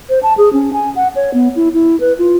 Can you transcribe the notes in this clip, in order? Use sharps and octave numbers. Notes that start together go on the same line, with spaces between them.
C5
A5
G#4
C#4
G#5
F#5
C#5
B3
E4
E4
B4
F4